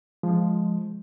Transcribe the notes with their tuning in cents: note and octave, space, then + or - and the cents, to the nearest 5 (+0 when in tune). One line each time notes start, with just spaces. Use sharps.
F3 +0 G#3 +0